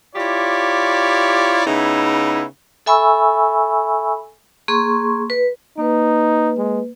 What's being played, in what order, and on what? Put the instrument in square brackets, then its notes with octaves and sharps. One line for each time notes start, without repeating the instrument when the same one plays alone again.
[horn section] E4 F4 G4 C#5 D5
C#3 B3 D#4 E4
[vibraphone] A4 E5 G#5 B5 C#6 E6
A#3 G#4 C6 C#6
B4
[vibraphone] A#3 B4 [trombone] D#4
[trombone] G#3